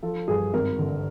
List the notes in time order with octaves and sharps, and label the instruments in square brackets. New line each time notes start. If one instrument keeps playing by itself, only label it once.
[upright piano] F3 A4
G2 G#4
G#1 A#4
D3